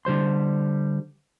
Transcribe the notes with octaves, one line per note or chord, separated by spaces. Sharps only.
D3 G3 C5 C6